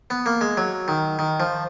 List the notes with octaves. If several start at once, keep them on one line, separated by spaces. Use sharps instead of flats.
B3
A#3
G#3
F#3
D#3
D#3
F3